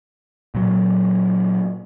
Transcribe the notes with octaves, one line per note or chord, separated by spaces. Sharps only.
A#2 F#3